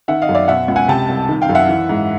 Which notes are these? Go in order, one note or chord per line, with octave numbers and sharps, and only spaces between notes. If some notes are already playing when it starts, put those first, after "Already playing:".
D#3 E5 F#5
D#5 F5
F#2
D5 E5
B2 E5 F#5
C#2
F#5 G#5
C3 G5 A5
C2
D#3
F5 G5
F#2
E5 F#5
E3
G#2